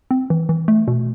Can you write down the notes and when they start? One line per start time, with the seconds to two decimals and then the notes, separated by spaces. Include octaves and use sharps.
0.11 C4
0.30 E3
0.49 E3
0.68 A3
0.88 B2